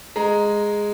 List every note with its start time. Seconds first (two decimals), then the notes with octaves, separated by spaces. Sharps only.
0.16 G#3 A#5